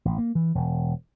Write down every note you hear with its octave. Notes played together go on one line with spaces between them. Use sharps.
A1
A#3
E3
E1